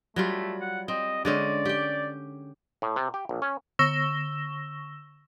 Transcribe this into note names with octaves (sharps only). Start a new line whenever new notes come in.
F#3 G3 A3 F4
F#5
C4 D#5
D3 G#3 C#4 D5
G4 G5
A2
C3
G4
A#1
C#4
D3 C#6 E6 A#6 E7 G7